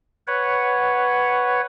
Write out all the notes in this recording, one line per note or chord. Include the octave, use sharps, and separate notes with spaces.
B4 C#5 F#5